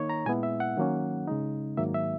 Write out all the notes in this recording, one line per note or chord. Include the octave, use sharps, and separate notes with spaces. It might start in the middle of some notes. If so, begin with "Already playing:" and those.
Already playing: D#3 A#3 D#4 C#5
A#5
A#2 G#3 B3 E4 G#5
E5
F#5
D#3 F#3 A#3 C#4
C#3 G#3 D#4
G#2 D#3 F#3 A#3 E5
E5